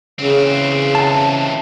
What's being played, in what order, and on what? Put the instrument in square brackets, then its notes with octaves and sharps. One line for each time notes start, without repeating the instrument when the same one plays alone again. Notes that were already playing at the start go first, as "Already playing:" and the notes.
[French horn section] C#3 [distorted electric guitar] E3 C4
[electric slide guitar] A5